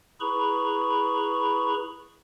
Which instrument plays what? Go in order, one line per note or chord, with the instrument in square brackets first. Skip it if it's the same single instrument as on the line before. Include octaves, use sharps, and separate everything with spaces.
[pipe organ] E4 G#4 B4 A#5 B5 C#6